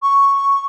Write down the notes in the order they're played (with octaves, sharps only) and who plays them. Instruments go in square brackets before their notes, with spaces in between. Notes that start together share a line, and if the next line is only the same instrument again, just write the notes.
[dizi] C#6